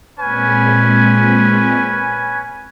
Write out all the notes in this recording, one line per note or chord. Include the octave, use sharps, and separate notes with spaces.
A#2 G#3 C4 C#4 B4 G#5